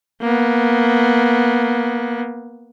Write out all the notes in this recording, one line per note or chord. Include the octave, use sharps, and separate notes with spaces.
A#3 B3